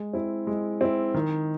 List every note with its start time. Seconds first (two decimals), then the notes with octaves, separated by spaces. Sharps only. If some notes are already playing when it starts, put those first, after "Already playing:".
Already playing: G#3
0.13 C4 E4
0.47 G#3
0.81 C4 E4
1.14 D#3